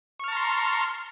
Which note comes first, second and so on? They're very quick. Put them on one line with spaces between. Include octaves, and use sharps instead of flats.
C#6 F6 A5 A#5 C6